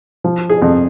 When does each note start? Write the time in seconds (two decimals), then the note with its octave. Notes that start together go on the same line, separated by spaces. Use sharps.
0.24 F3
0.50 G#4
0.62 F2